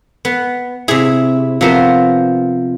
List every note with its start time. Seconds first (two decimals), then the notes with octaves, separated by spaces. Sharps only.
0.25 B3
0.88 C3 E4 G#4
1.61 C3 F3 B3 A#4 C5